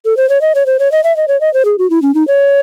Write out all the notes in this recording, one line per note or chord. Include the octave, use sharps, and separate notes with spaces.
A4
C5
C#5
D#5
C#5
C5
C#5
D#5
E5
D#5
C#5
D#5
C5
G#4
F#4
E4
C#4
D#4
C#5